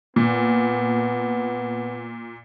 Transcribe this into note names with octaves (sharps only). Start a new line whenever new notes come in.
A#2 B3